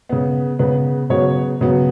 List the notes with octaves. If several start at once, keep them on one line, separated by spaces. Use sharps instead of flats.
C#3 B3
C#3 B3 B4
C#3 F#3 B3 C#5
C#3 F#3 B3